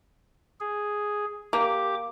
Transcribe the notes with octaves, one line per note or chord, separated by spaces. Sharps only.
G#4
A#3 G4 D6